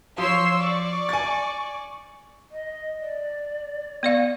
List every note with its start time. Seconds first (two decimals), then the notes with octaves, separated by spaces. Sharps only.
0.18 F3 C#5 C6 E6
0.61 D5 C#6
1.09 G#5 A6
2.51 D#5
3.00 D5
4.03 B3 D5 D#5 F5